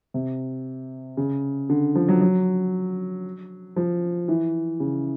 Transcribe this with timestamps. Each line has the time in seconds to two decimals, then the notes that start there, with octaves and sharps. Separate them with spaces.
0.14 C3
1.17 C#3
1.69 D3
1.95 F3
2.09 F#3
2.21 F#3
3.76 F3
4.28 E3
4.80 C#3